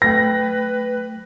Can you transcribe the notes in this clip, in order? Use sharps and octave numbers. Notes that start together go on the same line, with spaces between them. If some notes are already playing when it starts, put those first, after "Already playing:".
F#3 A3 B4 G5 A#6